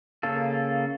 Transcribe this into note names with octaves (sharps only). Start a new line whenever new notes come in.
C#3 A#3 A4